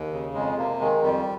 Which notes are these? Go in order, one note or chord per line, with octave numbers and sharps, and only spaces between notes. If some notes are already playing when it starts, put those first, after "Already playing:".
Already playing: D#2
C#3
F2 G#3
C3 A#3
D#3 G#3
F2 G3